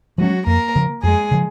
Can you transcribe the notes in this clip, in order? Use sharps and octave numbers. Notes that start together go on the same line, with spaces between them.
F3 F#3 G#3 C#4 F#4
F2 A#3 A#4
C#3 F3 A#3
F2 G#3 G#4
C#3 F3